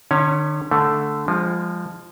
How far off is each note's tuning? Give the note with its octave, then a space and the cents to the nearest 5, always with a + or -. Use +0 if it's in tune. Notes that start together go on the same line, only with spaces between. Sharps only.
D3 +45 C#4 +0 C#5 +0
D3 +0 A3 +0
F3 +0 G#3 -30